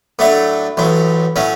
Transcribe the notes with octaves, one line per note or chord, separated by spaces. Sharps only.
A2 F#3 A3 D4
A1 A2 F#3
A2 F#3 C#4